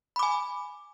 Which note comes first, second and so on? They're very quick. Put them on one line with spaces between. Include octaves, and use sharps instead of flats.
B5 D6 G#5